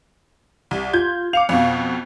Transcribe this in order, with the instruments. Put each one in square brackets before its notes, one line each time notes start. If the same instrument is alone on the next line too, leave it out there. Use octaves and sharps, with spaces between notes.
[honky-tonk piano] C2
[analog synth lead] F4 [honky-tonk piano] G6 G#6
[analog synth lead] F5 [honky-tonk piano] D6 C#7 F7
[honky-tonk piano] F2 B2